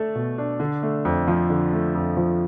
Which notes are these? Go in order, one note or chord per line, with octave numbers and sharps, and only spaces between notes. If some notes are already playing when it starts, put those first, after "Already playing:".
Already playing: A3 D4 A4
B2
D4
D3
A3
F2
F3
D3
A3
F2
F3